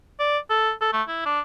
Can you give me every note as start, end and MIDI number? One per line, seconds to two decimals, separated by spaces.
0.20 0.38 74
0.50 0.72 69
0.81 0.89 69
0.93 1.02 57
1.08 1.24 64
1.26 1.40 62